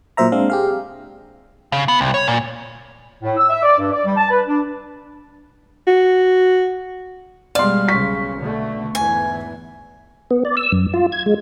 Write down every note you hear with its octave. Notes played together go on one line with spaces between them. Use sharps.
A#2 F#3 C5 E5 A#5
G#3 C4 D4 F5
G4 G#4 F5
C#3
B3
C2
C#5
A#2
A2
E6
E5
D5
G2
D5
G3
A5
B4
D4
F#4
B2 G3 G#3 D5 F5 C6
B1 C#3 C#6 B6
B2 D3 A3
E2 G#2 E3 G#5
B3
D5
E6
F#2
F4
G#6
G#3